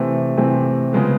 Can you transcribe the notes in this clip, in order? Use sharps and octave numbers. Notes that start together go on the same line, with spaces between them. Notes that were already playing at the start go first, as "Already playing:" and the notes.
Already playing: C3 E3 A3 C4
C3 E3 A3 C4
C#3 F3 G#3 B3